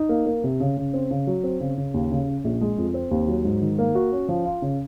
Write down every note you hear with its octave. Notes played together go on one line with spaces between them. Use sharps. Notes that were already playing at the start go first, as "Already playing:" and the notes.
Already playing: D#4
A#3
A#3
C3
C#3
C#3
C4
C#3
F#3
C4
C#3
C#3
D#2
C#3
C#4
A#1
G#3
F2
C4
D#2
F#3
G#2
D#3
A#3
F#4
C#4
F3
F4
C#3